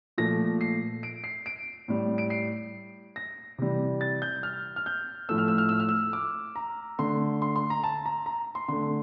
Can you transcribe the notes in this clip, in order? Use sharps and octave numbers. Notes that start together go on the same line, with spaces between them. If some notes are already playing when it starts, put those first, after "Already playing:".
A#2 F3 A3 A#6
C7
D7
C7
D7
A2 G3
D7
C7
A#6
C3 E3 G3
A6
G6
F6
F6
G6
A2 F3 A3 E6
F6
E6
F6
E6
F6
E6
D6
A#5
D3 A3 C6
C6
C6
A#5
A5
A#5
A#5
C6
D3 A3 C6